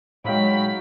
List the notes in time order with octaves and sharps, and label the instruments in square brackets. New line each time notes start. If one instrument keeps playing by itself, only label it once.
[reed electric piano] A2 G#3 [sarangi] F#3 [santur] D#4 F5 G5 [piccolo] B5